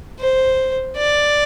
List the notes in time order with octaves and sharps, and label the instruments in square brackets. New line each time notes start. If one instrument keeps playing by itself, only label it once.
[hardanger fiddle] C5
D5